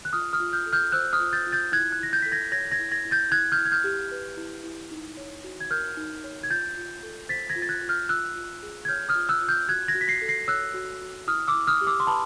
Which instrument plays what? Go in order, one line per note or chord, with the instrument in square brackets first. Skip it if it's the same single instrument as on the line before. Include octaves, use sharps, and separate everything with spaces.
[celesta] F#6
F4 D#6 F6
D#6 F6
F4
F6 G6
A4
F6 G6
C5 E6 F#6
D#6 F6
F4
G6 A6
F4
G6 A6
E4 F#6 G#6
F#6 G#6
E4 A#6
G6 A6
A4 B6
G#6 A#6
C#5 G#6 A#6
G#6 A#6
E4
G#6 A#6
E4
G6 A6
E4 F#6 G#6
F6 G6
E4
G#6
F6 G6
G4
B4
E4
E4
D#4
C#5
F#4
G#6
A#4 F6 G6
D#4
C#5
G#6
F4 G6 A6
F4
A4
C5 A6 B6
G#6 A#6
F4
A6
F#6 G#6
F4
F6 G6
F4 E6 F#6
F4
G#4
G#6
C#5 F6 G6
D#6 F6
F4
E6 F#6
F4
F6 G6
F#4 F#6 G#6
G#6 A#6
F#4
B6
A#6 C7
A4
A#6 C7
C#5 E6 F#6
F#4
F#4
E4 D#6 F6
D6 E6
E4
D#6 F6
G4
D6 E6
C6
B4 A5 B5